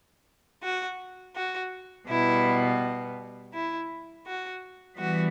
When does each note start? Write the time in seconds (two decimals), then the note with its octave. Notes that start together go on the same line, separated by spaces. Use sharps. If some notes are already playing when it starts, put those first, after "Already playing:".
0.63 F#4
1.36 F#4
2.08 B2 G3 B3 E4
3.54 E4
4.26 F#4
4.98 E3 G3 B3 F#4